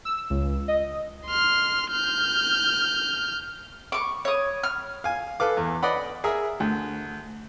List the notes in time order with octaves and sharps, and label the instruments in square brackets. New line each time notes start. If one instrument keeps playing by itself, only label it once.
[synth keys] E6
C#2
D#5
[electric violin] C6 F6
F6 G6
[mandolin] C#6 D6
C#5 D#6
F6
[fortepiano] F5 G#5
A4 B4 F5 D6
E2
B4 D5 D#5 F#5 B5
G#4 A#4 E5
D2